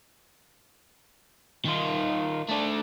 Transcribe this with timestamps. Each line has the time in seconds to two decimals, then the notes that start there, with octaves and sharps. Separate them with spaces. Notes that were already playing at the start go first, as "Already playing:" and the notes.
1.65 D#3 F4
2.49 A3 D4